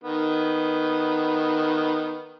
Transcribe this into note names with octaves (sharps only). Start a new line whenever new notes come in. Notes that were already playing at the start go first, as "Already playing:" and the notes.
D#3 B3